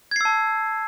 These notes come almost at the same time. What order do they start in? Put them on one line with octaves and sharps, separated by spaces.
G#6 C7 E6 A5